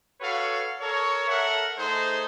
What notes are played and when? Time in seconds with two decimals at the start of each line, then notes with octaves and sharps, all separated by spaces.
0.21 F#4 A4 B4 C#5 F5
0.81 A4 A#4 C#5
1.28 A4 A#4 E5 F#5
1.78 A3 D#4 G#4 C5